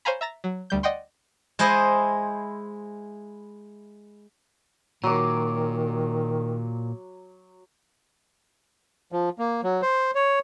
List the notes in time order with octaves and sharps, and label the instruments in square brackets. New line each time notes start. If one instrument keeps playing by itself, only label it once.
[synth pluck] C5 C#5 F5 G#5 A#5 B5
E5 A#5 A6 A#6
F#3
D2 G3 G6
D5 D#5 F#5 G5 C6
[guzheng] G#3 E4 C5 D#5
[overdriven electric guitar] A#2 [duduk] D#3 [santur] F#3 D6
[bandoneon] F3
A#3
F#3
C5
C#5